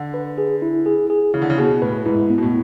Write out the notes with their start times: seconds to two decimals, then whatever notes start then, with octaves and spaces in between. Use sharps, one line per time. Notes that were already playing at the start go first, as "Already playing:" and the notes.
Already playing: D3
0.14 B4
0.38 G#4
0.62 E4
0.86 G#4
1.10 G#4
1.34 C#3 E4
1.42 D3
1.50 C#3
1.58 B2 G#4
1.82 A2 B4
2.05 G#2 E4
2.30 B3
2.38 B2
2.43 A2